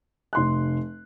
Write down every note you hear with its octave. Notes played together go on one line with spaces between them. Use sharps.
F1 C6 F#6